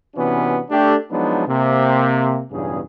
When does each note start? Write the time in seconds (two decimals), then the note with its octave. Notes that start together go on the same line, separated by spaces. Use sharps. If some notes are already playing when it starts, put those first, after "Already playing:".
0.16 C3 E3 B3 C#4 D4 F#4
0.70 A3 D4 G4
1.11 F3 F#3 G#3 B3 D4 D#4
1.47 C3 A#3
2.51 B1 E2 G2 C#3 G#4